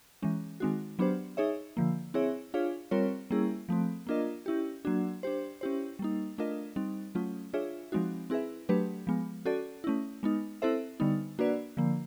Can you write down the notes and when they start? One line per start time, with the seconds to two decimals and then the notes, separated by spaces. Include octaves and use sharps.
0.22 E3 G#3 C#4
0.60 D#3 G#3 C4 D#4 F#4
0.99 F#3 B3 D4 G4 C5
1.37 D#4 G#4 C#5 E5
1.77 D3 F3 A#3
2.14 C4 E4 G#4 C#5 E5
2.54 D4 F4 G#4 C#5 F5
2.91 G3 C4 F4 A#4 C#5
3.30 G3 A#3 C#4 E4 G#4
3.69 F3 A3 C4
4.07 A#3 D4 F4 A#4 D#5
4.46 C#4 E4 G4
4.85 F#3 A#3 D4 F#4
5.23 D4 G4 C5
5.61 C#4 E4 G4 C5
5.99 G3 A#3 D#4
6.38 A3 D4 F4 A#4 D#5
6.76 G3 C4 D#4
7.15 F#3 A3 C#4 F4
7.54 D4 F4 G#4 C#5 E5
7.92 F3 G#3 C4 D#4 F#4
8.30 C4 E4 G#4 B4 E5
8.69 F#3 A3 D4 G4 B4
9.07 F3 G#3 B3
9.45 C#4 F#4 A4 D5
9.84 A3 C#4 E4
10.23 G#3 B3 D#4
10.62 C4 E4 A4 C5 E5
11.00 D3 G3 B3 D#4
11.39 A#3 D4 F#4 B4 D5
11.77 D3 F3 A#3